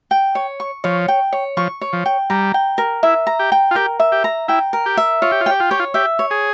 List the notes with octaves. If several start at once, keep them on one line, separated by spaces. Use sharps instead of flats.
G5
C#5
C#6
F3 C#5
G5
C#5
F3 C#6
C#5
F3
G5
G3 A#5
G5
A#4
E4 E5
A#5
G4
G5
F4
G4 A#4
E5
G4
A#5
E4 G5
A#4
G4
E5
F4 C#5
G4
F4
G4 G5
F4
G4 C#5
F4
G4 E5
C#5
G#4